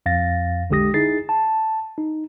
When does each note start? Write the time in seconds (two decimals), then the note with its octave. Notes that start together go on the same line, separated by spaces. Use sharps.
0.06 F2 F5 A6 A#6
0.70 B1 D3 G#3 G4 D#6 A#6
0.94 D#4 E4 G#4 A6 C7
1.29 A5
1.98 D#4